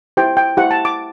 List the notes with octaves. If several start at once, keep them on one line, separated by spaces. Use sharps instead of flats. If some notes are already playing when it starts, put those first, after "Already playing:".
E4 G4 C5 G5
G5
E4 G4 C5 F#5
A5
D6